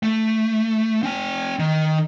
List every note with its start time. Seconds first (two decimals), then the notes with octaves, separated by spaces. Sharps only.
0.03 A3
1.03 C4 G#5
1.59 D#3